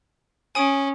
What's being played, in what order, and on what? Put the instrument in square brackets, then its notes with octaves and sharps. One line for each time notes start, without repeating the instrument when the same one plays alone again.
[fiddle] C#4 [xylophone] G#5 D#6 D7